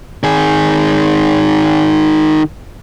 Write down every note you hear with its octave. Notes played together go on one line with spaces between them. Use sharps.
D#3 G#4